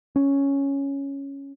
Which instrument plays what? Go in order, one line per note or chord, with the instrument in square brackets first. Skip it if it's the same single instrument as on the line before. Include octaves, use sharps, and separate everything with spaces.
[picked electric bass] C#4